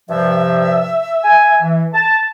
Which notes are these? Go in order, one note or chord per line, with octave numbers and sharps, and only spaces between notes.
G2 C3 F3 E5
G#5
E3
A5